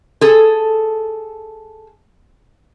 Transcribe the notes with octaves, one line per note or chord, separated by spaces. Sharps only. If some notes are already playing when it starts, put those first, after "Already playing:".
G#4 A4